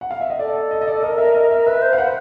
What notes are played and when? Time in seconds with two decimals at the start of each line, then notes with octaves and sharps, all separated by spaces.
0.01 F#5
0.11 F5
0.21 E5
0.30 D#5
0.39 A4 D5
0.71 D#5
0.81 D#5
0.87 D5
1.03 A#4 D#5
1.18 E5
1.35 D#5
1.51 E5
1.67 B4 E5
1.82 C5
1.93 F5
1.98 B4 F#5